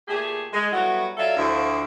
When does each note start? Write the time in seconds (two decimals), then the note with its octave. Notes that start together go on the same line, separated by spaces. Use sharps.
0.08 A#2 A3 G4 G#4
0.52 G#3
0.72 F#3 G3 A3 B3 E4 F#4
1.17 F#3 F4 A4 D5 E5
1.36 D2 F3 E4